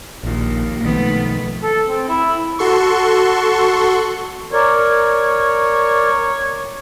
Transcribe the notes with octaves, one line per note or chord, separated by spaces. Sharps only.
A#1 D#2 A#2
B1 D#3 F3 A3 B3
A4
C4
E4
F#4 A4 C6 C#6
A#4 C#5 D5